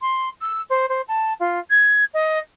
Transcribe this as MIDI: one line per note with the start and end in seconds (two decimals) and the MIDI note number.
0.01 0.29 84
0.41 0.62 88
0.70 0.86 72
0.89 1.01 72
1.08 1.33 81
1.40 1.59 65
1.70 2.04 92
2.14 2.39 75